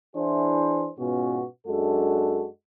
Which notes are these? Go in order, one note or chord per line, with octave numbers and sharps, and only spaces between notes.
E3 D4 E4 G#4 C5
G#2 B2 B3 C#4 F4 F#4
F#2 G#3 D4 F#4 A4